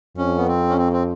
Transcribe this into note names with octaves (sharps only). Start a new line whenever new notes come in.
F2 C#4
B3
C4
C#4
C4
C4